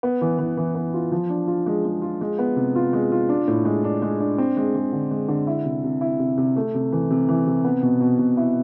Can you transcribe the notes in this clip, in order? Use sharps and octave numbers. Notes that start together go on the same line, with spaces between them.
B3
E3
E3
E3
B3
F4
F3
D4
F4
G#3
G#3
F4
G#3
B3
C3
F4
G#3
F4
D4
A2
G#3
D4
G#3
D4
C4
G#3
G#3
D3
G#3
D3
E4
C3
C3
E4
C3
C3
A3
C3
E3
C3
E3
C3
B3
B2
B2
B2
E4